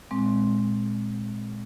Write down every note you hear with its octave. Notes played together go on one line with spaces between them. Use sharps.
A#2 G#3 C4